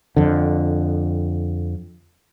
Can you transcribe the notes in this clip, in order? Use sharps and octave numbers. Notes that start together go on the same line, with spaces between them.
F2 D3